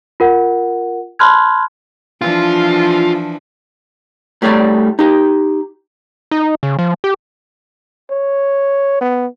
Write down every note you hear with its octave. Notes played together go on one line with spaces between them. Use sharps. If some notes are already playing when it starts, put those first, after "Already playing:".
F4 A#4 F#5
A5 B5 C6 F6 F#6 G#6
E3 F3 D4 F4
A2 G3 A3 C#5 D5
D#4 G4
D#4
C#3
F3
G4
C#5
B3